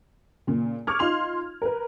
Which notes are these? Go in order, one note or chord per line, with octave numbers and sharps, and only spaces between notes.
A#2 C#3
C#6 D6 F6 G#6
D#4 F4 C6 F7
A#4 B4